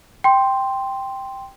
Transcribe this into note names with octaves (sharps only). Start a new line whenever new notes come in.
G5 C6